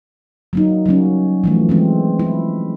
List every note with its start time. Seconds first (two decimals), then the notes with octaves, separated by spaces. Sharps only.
0.53 F#3 A#3 D#4
0.86 F#3 G3 A#3 C#4
1.44 E3 F3 A3
1.69 E3 G#3 C4
2.19 E4